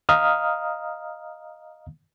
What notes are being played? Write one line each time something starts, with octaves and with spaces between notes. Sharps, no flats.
D#5 F5 A#5 D#6 F6